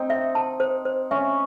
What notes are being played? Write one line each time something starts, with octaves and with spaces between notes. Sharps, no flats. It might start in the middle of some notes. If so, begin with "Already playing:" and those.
Already playing: C4 D#4
E5
A5
C5
C5
C#4 E5